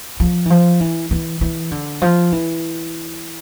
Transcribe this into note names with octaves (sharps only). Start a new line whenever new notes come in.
F3
E3
F3
E3
E3
E3
D3
F3
E3